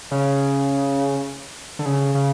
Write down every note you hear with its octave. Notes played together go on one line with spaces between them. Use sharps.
C#3
D3
C#3
C#3